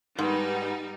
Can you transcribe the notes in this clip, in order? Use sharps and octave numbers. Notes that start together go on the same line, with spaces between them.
G#2 G3 B3 D#4